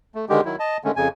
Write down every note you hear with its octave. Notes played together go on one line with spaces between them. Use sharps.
A3
D3 D#3 G#3 G4
D#3 F#3 E4
D#5 A5
D3 D#3 G#3 A3 C#4
F2 C#3 G#5